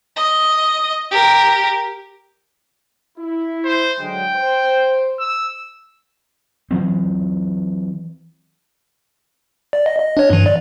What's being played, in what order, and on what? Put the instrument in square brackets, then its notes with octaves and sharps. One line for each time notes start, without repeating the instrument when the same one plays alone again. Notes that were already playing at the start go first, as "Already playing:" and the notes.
[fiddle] D#5
G4 A#4
[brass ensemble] E4
[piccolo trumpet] C5
[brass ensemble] D3 F#3 G#3 [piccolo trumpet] G5
[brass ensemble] C5
[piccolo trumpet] E6
[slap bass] E3 F#3 C4
[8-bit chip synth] D5
D#5
D#5
D4 C#5
G2 E3
D5